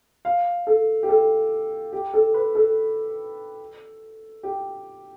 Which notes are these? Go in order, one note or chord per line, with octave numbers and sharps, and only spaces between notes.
F5
A4
G4
A4
G4
A4
B4
A4
G4